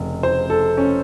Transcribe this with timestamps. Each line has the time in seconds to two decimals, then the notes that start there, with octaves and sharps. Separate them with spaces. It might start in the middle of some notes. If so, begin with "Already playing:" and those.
Already playing: F1 C#3
0.23 C5
0.50 A4
0.77 C#4